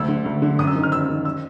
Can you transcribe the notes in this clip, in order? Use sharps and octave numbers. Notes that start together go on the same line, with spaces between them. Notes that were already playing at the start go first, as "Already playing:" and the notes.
Already playing: D2 E6
D3
D2
D3
F#2 D#6
E6
D#3
F6
F#2 E6
D#3
E6